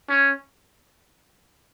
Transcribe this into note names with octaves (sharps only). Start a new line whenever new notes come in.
C#4